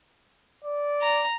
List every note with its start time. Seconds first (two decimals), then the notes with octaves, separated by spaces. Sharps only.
0.64 D5
1.02 A#5